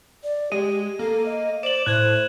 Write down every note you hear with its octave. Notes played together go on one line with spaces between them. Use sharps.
D5
G#3 G4 D#7
A#3 A4
D#5
C5 D5 E7 F#7
A2 C5 F#6 G#6